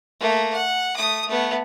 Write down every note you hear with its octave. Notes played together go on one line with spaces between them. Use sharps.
A3 A#3
F#5
A3 D#6
A3 B3